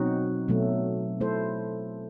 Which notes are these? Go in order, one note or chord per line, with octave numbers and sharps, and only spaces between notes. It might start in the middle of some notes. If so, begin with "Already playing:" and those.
Already playing: B2 F#3 C4 D#4 F#4
B2 F#3 A3
A3 E4 A4 C5